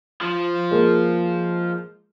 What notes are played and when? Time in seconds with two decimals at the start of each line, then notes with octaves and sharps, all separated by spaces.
0.21 F3
0.71 G#3 A#3